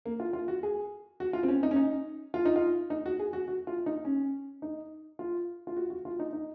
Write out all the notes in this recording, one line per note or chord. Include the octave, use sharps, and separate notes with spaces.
A#3
F4
F4
F#4
G#4
F#4
F4
C4
C#4
D#4
C#4
D#4
F4
D#4
F4
D#4
F#4
G#4
F#4
F#4
F4
D#4
C#4
D#4
F4
F4
F#4
F#4
F4
D#4
D#4